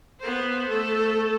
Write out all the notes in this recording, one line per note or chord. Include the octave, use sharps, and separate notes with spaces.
B3 C5
A3 A4